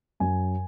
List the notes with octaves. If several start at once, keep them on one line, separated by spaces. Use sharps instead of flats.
F#2 F#3 G#5